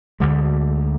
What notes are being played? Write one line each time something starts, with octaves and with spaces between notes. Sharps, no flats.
D2 D3 G#3